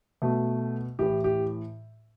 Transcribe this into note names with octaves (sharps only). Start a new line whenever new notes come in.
B2 A3
A2 E3 G4
G4